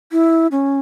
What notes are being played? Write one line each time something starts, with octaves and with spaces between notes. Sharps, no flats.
E4
C#4